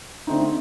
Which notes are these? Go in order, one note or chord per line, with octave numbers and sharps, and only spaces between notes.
D3 A3 C4 D#4